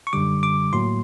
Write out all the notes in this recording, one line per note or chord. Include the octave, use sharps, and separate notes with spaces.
C#6
F#2 D3 G3 D6
D6
A2 F#3 A#3 C6